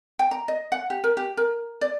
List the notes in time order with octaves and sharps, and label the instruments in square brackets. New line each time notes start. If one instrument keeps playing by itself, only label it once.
[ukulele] G5
A#5
D#5
F#5
G4
A#4
G4
A#4
D5